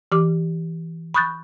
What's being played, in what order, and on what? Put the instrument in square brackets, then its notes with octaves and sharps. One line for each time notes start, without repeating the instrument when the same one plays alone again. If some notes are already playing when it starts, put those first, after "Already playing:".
[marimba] E3 G4 D6
B5 C#6 D#6 F#6 G6 A6